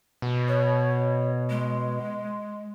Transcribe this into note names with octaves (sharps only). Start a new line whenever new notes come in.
B2
C#5
G#3